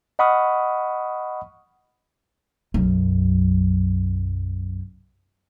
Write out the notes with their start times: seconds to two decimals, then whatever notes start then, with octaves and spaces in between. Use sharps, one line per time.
0.19 D#5 F#5 B5 C#6 D#6 F6
2.74 B1 F#2